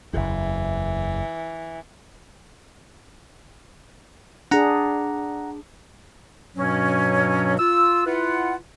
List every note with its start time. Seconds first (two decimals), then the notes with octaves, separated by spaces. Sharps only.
0.13 F#1 E2 E3
4.51 D4 G#4 F#5 A#5
6.56 G2 B2 F#3 C#4
7.59 F4 E6
8.06 E4 F4 B4 F#5